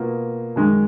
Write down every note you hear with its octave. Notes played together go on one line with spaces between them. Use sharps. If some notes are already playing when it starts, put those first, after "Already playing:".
Already playing: B2 A#3 F4
F#2 D#3 G#3 D#4